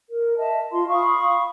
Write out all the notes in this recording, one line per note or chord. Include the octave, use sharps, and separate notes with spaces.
A#4
D#5 E5 A5
F4 C6
F5 B5 C#6 D#6